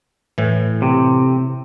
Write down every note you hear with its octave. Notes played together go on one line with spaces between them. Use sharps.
A2 E3
C3